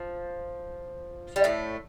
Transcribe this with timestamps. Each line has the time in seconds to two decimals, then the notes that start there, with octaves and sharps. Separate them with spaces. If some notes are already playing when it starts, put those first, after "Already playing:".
Already playing: F3
1.36 G3
1.44 A2 A3